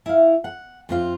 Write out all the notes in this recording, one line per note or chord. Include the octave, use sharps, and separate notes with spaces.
E4 F5
F#5
F2 C4 F4